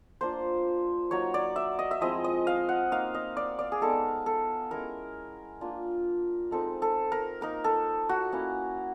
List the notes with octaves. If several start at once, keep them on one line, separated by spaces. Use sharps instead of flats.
A#3 D4 F4 C5
F#3 A#3 D#4 C#5
D5
E5
D#5
E5
F3 G#3 C4 E4 D#5
D#5
F5
F#5
A#3 D#4 F5
D#5
D5
D5
G#4
G#3 B3 D#4 A4
A4
G#3 C#4 E4 A#4
A#3 D4 F4
G#3 C4 D#4 A4
A4
A#4
A#3 D#4 A#4
A4
F#4
A#3 C#4 E4